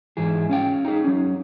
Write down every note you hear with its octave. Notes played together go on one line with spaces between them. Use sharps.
G#2 E3 E4 G#4
C#4 F5 G5
D#4 G#4
F#3 C#4